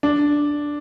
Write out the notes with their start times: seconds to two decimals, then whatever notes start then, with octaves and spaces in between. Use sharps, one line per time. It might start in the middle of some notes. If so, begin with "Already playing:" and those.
0.03 D4